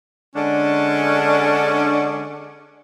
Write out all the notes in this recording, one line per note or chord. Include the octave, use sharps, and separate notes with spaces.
D3 G#3 C#4 D4